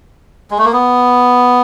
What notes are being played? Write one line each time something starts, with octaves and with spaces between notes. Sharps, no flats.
G#3
A3
A#3
B3